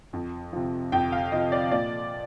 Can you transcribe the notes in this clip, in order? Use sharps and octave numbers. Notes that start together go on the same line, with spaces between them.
F2
C3 F3
F2 G5
F5
C3 F3 D#5
D5
A#2 D5